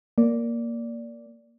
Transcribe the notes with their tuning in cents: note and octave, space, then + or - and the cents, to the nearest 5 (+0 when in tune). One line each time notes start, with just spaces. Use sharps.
A#3 +0 D5 -10